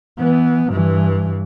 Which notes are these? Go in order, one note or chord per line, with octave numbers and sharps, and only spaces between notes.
E3 B3
G2 E3